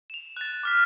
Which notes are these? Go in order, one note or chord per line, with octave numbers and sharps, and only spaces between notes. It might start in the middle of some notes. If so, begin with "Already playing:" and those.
E7 F7
F#6 A6
D6 F6 B6